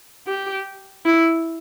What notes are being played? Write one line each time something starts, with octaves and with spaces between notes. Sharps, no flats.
G4
E4